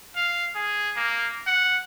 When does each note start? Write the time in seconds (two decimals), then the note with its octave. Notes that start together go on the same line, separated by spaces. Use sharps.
0.16 F5
0.55 G#4
0.97 A#3
1.47 F#5